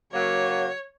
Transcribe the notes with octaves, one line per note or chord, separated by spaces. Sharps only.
C#3 F#3 A#3 C#5